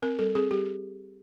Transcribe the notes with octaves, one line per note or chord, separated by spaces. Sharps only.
C4 A#4
G3 A4
C4 G#4
G3 G4